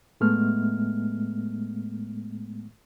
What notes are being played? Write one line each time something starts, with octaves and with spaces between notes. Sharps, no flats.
A2 G#3 A3 B3 F6